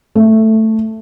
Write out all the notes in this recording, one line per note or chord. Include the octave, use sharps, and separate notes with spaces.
A3